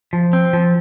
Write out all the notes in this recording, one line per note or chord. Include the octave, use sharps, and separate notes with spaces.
F3
C4
F3